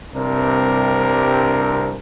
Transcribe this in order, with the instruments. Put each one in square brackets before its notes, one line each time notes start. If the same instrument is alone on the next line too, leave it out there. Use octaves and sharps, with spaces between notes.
[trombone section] C2 G2 C3 C4 D4 A#4